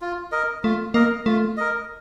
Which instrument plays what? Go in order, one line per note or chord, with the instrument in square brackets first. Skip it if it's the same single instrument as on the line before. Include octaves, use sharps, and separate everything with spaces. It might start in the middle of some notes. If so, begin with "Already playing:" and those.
[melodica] F4
A#4 D#5
[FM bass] A3 [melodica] F4
[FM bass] A#3 [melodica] A#4 D#5
[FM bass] A3 [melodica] F4
[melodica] A#4 D#5